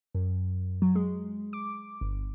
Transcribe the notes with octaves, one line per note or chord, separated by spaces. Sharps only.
F#2
F#3
G#3
D6
G1